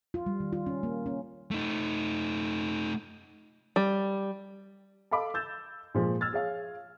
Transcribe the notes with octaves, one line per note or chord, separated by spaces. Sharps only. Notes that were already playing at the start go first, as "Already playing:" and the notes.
F4
G3
D#3
F4
C#4
A#3
C#4
A3 D#4
G3
A4 D#5 F5 B5 D6
E6 G6 A6 E7
A#2 F3 G#3
E6 F6 G#6 A6
G#4 C#5 F5